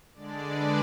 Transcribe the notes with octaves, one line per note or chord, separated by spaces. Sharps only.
D3 G#3 D4 D5
B4